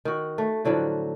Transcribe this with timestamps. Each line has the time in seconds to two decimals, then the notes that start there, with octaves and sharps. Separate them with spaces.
0.05 D#3 F#4
0.38 A3
0.65 A2 D3 F3 F#3